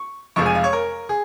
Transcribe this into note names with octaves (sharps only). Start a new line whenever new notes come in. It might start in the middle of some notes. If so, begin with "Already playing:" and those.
Already playing: C#6
F1 F2 F3 G#3 C#6
G#5
F5
C#5
A#4
G#4